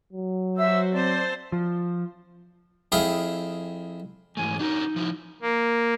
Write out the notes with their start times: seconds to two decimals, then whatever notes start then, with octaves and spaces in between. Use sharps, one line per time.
0.12 F#3
0.57 F#4 C5 E5 E6
0.93 C4 C5 D5 A5
1.52 F3
2.92 F2 E4 G#4 F5 G5 D#6
4.37 G#2 E3 A3 G#5
4.59 D4 D#4 F#4 A#4
4.96 F3 E4 F#4
5.42 A#3